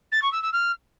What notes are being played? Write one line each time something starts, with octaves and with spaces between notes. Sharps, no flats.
A6
C#6
E6
E6
F6